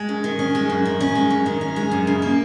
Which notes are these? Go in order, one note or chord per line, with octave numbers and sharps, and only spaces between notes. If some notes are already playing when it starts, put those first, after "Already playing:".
Already playing: G#3
F#2
D#3
C#4
G#3
F#2
D#3
C#4
G#3
F#2
D#3
C#4
G#3
F#2
C#3
A#3